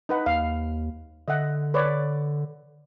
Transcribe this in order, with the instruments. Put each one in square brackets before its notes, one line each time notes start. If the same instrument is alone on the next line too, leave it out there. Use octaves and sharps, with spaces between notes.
[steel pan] D#4 B4 F#5
[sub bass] D#2 [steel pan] F5
[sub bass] D3 [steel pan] D#5 E5 F#5
[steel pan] B4 C#5 D5